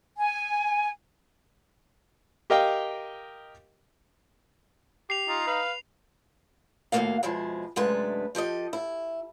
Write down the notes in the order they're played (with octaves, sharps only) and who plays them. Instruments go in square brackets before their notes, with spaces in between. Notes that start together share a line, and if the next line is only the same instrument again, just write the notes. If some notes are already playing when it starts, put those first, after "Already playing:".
[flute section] G#5
[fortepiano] G4 A#4 D#5 F5 G5
[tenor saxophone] G4 [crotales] C7 F7
[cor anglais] D#4 [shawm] F4
[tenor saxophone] B4 [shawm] F5
[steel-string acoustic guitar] D#2 A2 G#3 A#3 F#4 F5
F2 B2 F3 G#3 E4
F#2 C3 G#3 A3 D4 B4
F3 G4 A4 D#5
E4